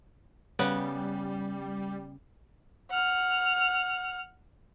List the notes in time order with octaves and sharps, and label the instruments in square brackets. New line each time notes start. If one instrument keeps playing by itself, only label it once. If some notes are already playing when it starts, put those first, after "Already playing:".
[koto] C#3 B3 [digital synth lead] G3
[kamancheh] F#5 F6